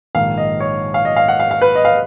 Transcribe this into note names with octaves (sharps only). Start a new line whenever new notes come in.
A#1 G#2 D#3 F5
D#5
C#5
F5
D#5
F5
F#5
F5
F5
B4
D#5
F5